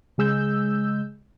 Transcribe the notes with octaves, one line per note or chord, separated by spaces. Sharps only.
C#3 G#3 E6 G6